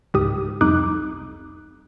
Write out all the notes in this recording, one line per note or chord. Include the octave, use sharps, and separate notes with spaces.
C#2 G#2 G4 D#6
C2 F2 D#4 D6 D#6 F#6